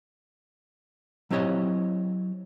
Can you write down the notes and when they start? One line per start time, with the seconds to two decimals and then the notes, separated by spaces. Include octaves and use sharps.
1.31 F#3 C4 E4 G4 C#5 D#5